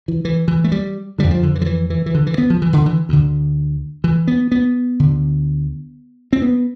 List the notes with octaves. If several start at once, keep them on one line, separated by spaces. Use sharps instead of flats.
E3
E3
E3
A3
G3
F2 D3 G3
F3
D3
E3
F3
E3
E3
E3
D3
E3
B3
F3
E3
D3
E3
D2 D3
E3
B3
B3
D2 D3
C4
B3